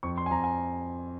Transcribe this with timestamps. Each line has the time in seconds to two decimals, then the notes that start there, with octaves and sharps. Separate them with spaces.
0.03 F2 C#6
0.17 C6
0.26 G#5
0.31 F2 A#5
0.44 G#5